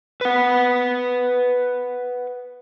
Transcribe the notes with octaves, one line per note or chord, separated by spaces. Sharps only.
B4 F#5